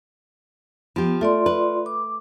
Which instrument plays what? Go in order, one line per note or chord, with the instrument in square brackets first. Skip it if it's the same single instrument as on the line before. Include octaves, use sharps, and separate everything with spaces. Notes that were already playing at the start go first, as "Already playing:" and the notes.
[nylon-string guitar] F3 G4 [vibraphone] B3
[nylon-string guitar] A3 [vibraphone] F4 D5 C6
[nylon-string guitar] B4
[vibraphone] D6